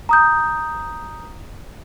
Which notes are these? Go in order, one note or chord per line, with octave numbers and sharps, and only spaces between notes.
A#5 D#6 G6